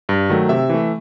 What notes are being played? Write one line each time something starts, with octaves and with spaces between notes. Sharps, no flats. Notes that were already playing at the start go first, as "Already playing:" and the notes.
G2
D#3 F#3 A3
C3 E5
E3 A3